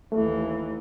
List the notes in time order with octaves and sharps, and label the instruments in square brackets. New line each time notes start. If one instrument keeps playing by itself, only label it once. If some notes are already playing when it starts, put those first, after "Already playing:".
[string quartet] D#2 E3 [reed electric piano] A3